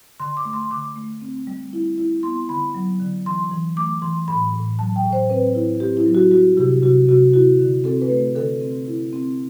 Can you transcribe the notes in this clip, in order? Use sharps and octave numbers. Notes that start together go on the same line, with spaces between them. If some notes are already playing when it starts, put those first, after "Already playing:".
D3 C6
D6
A3
C6
D3 D6
A3
C4
G3
E4
E4
B3 C6
D3 B5
F#3
D3
E3 C6
E3
A3 D6
E3 C6
A2 B5
A2
F#3 A5
G5
A2
C5
C4 B4
E4
C4 G4
E4
F#3
F#4
G3 F#4
C3 G4
C3 F#4
C3 F#4
E4 F#4
D3
C4 A4
B4
A3
D3 A4
C4
E4
C4